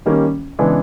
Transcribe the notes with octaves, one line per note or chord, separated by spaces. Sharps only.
D#3 G3 A#3 C#4
C#3 E3 G#3 B3 D4